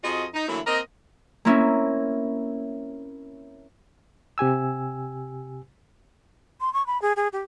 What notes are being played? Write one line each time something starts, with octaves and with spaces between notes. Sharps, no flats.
F2 F4 F#4 G#4 D#5
D#4
D3 E3 F#3 A3 A#3 E4
A#3 C4 A#4 D#5
A#3 C4 C#4 E4
C3 G4 G#5 E6
C6
C#6
B5
G#4
G#4
G4